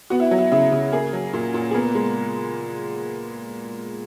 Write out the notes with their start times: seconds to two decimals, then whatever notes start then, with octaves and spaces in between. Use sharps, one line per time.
0.10 B3 F#4
0.20 E4
0.31 F#3
0.38 E4
0.52 C#3 E4
0.72 C#3
0.92 A#3 G#4
1.13 F#3
1.34 A#2
1.54 A#2
1.71 G#4
1.75 B3 A#4
1.95 G#3